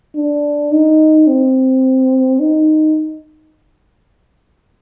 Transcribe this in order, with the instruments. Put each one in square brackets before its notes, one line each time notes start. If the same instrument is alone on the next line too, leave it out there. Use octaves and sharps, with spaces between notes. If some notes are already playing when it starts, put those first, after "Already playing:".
[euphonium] D4
D#4
C4
D#4